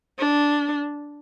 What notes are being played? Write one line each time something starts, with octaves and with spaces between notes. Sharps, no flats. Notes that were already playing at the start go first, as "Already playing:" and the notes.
D4